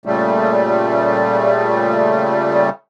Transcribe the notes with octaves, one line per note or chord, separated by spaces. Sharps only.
A#2 C#3 G3 A3